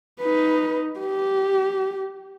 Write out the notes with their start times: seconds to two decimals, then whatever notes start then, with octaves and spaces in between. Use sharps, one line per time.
0.20 D#4 B4
1.00 G4